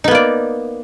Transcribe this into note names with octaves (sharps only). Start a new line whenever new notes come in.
A#3 B3 D#4 D5